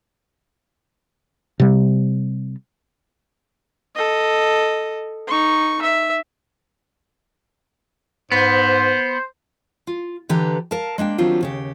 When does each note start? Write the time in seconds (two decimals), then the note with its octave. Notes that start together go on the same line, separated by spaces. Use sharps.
1.60 C3 G3
3.95 A4 D#5
5.28 D#4 C#6
5.82 E5
8.32 G#2 B3 C5
9.87 F4
10.29 D3 E3 G4 A4 B4 A#5
10.71 A#4 F5 A5
10.98 G#3 A#3 D4 G5
11.18 D#3 F#3 G3 C4 D4 F4
11.41 D#2 C#3 G4